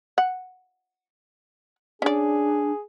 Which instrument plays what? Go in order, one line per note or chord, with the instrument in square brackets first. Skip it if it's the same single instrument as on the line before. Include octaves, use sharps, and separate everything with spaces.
[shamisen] F#5
[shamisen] C#4 D5 [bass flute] D4 [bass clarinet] G#4